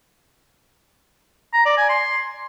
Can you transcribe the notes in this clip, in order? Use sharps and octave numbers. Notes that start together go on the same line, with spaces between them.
A#5
D5
G#5
C6